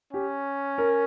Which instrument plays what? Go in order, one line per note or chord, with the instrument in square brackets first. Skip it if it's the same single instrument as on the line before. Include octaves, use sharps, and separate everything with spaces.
[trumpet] C#4 [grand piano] G4
[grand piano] A#4